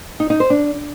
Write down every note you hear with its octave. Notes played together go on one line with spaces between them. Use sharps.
D#4
D#4
C5
D4